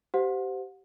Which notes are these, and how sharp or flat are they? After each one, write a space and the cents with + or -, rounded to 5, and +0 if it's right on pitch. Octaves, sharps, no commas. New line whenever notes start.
G4 -25 C5 -20 F#5 -35